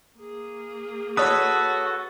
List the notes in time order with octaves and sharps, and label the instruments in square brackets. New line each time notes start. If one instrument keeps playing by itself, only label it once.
[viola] A#3 G#4
[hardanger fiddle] F#4 [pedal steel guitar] A4 B4 [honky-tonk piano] C#5 D#6